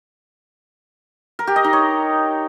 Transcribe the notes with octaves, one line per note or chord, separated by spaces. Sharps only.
A#4
G4
D#5
D#4
C#5